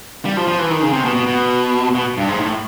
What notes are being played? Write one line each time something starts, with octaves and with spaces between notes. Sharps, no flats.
G3
F3
F3
E3
D#3
C#3
C3
B2
B2
B2
B2
G2
G#2
A2